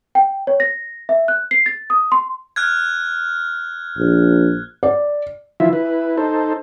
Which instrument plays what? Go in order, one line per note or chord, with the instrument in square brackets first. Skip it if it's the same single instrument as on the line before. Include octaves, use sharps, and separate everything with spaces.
[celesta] G5
C#5
A#6
E5
F#6
C7
A6
D#6
C6
[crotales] F6 F#6 G#6
[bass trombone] A#1
[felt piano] D5
[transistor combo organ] E3 F3 E4 F4 E5
E4 B4
D#4 A4 C5